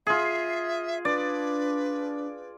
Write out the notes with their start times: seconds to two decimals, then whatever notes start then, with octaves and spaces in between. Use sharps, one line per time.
0.07 F4 G#4 E5
1.05 D4 B4 D5